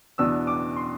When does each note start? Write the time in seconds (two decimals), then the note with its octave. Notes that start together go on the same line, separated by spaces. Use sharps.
0.18 E2 B2 B3 D4 E6
0.47 D6
0.76 C6